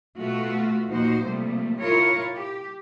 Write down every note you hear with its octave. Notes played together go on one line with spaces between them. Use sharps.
B2 A3 F4 F#4
D#2 A#2 F3 D#4 F#4 C5
C3 F3 G3 A3 A#3
E4 F4 A#4 C#5
G4